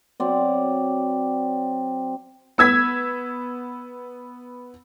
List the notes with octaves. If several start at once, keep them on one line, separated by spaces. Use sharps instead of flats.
F#3 C4 D5
B3 E6 G#6 B6